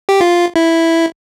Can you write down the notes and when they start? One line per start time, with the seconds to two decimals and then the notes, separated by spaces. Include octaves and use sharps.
0.09 G4
0.21 F4
0.56 E4